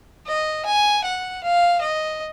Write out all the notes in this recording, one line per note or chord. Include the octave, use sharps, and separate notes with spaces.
D#5
G#5
F#5
F5
D#5